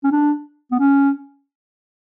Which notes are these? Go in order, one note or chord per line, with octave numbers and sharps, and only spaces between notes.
C#4
D4
B3
C#4